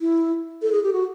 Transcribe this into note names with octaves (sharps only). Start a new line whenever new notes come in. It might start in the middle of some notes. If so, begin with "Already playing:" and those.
E4
A4
G#4
G4
F#4